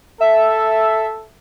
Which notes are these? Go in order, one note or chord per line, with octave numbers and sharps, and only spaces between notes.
A4 E5